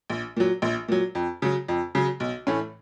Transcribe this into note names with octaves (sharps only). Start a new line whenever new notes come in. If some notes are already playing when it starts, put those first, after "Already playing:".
A#1
A#2 F#3
A#1
A#2 F#3
F2
C#3 F#3
F2
C#3 F#3
B1
A2 E3 A3 C#4